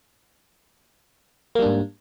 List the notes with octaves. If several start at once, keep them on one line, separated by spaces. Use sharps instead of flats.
G#2 G3 A#3 D4